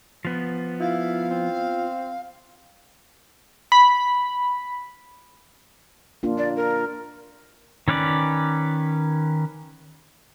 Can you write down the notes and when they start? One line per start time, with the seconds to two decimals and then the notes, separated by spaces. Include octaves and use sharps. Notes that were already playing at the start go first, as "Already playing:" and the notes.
0.25 F3 B3
0.80 E4 F4 F5
1.30 C4
3.72 B5
6.23 A#3 D4 F4
6.38 D5
6.56 A#4
7.88 D#3 C#4 B4 D5